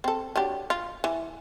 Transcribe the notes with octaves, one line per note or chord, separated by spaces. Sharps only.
C4 A4
F#3 D4 G4
F4
E3